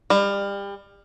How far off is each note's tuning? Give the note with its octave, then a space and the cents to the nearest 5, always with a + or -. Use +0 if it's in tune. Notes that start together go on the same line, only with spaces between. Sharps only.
G3 +30